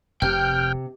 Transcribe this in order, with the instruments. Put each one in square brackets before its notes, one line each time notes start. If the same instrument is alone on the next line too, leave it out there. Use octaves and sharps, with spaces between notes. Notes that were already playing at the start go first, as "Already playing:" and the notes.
[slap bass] F1 [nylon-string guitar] C3 [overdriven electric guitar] G5 [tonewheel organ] F6 G6